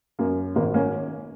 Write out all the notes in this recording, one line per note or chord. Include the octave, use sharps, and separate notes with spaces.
F#2 A#3
G#1 A#3
A#3 C#4